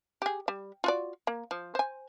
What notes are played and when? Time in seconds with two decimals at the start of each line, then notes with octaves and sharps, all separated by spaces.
0.22 G4 G#4
0.48 G3
0.84 F4 F#4 D5
1.27 A#3
1.51 F3
1.75 C5 G#5